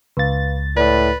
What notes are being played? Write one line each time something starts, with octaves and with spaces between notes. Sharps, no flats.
C#2 B4 F5 A6
A2 B4 D5